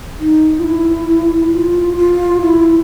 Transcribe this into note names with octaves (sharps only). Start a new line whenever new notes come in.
D#4
F4
E4
F4
F4
E4